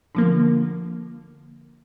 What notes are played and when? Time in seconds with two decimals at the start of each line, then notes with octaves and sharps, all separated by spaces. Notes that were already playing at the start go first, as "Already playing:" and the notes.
0.15 D3 F3 A#3